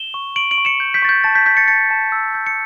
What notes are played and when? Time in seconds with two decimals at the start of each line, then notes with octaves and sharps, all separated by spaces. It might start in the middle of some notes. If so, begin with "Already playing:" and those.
Already playing: E7 G7
0.14 C#6
0.36 C#6 D7 F#7
0.51 D7 F#7
0.58 C#6
0.65 C#7 E7
0.80 G6
0.94 G6 B6
1.02 C#6 A6
1.09 G6
1.24 A5 A6
1.35 G6 B6
1.46 G6 B6
1.57 A6 C#7
1.68 A5 A6 C#7
1.91 A5
2.12 E6
2.35 G6
2.47 C#7